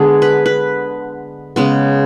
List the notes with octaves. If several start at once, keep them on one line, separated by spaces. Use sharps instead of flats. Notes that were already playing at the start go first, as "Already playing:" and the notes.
Already playing: D3 G#3 B3 G#4
B4
B4
C#3 G#3 B3